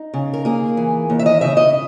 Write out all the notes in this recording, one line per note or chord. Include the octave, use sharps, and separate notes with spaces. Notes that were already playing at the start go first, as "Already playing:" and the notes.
Already playing: D#4
C#3
A#4
A#3 G#4
E3
D#2
E5
D#5
C#3 E5
D#5